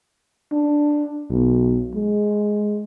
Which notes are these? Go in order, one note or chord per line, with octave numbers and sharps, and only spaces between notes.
D4
B1
G#3